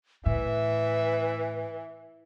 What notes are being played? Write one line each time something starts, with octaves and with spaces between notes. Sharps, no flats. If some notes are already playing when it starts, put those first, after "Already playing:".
A2 E3 B4 E5